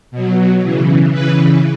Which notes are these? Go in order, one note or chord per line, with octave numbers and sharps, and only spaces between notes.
B2 F#3
C#3 E3
C#3 E3 B4